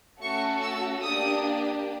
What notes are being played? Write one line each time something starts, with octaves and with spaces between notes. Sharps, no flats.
A3 C#4 F#4 A4 C#6
E6
A#3 D4 G4 D#6